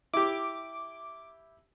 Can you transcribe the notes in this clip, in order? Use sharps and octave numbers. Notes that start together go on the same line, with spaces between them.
E4 G4 D6